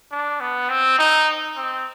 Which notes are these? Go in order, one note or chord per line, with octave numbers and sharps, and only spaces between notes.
D4
B3
C4
D#4
C4